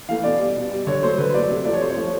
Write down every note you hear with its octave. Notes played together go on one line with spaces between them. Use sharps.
E3 A3 F5
B2 D5
G3
B2
G3
D3 C#5
F#3 A3 C5
D3 B4
F#3 A3 D5
C3
F3 A3 D5
C#5
C3 C5
C#5
F3 A3